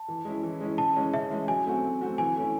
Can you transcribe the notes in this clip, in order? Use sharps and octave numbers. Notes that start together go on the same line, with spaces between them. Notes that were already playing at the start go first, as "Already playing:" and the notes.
Already playing: A5
E3
G#3 C#4 E4
E3
G#3 C#4 E4
C#3 A5
E3 G#3 C#4
C#3 E5
E3 G#3 C#4
F#3 G#5
A3 C4 F#4
F#3
A3 C4 F#4
E3 G#5
A3 C#4 E4